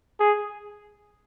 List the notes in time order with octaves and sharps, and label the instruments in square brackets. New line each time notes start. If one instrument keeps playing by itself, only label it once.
[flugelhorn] G#4